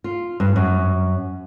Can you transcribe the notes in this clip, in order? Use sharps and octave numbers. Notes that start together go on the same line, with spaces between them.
F4
G2
F#2